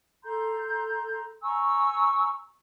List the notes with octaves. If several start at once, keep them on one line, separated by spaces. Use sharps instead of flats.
A4 A#5 C6 G6
G#5 A#5 C#6 E6